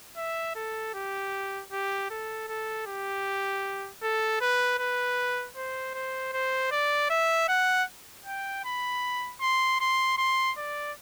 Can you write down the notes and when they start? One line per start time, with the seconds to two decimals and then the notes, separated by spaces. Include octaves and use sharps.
0.17 E5
0.55 A4
0.94 G4
1.72 G4
2.10 A4
2.48 A4
2.86 G4
4.02 A4
4.40 B4
4.79 B4
5.56 C5
5.94 C5
6.33 C5
6.71 D5
7.10 E5
7.48 F#5
8.26 G5
8.65 B5
9.41 C6
9.80 C6
10.18 C6
10.57 D5